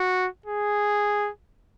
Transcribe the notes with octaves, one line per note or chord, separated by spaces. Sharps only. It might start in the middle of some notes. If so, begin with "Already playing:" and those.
Already playing: F#4
G#4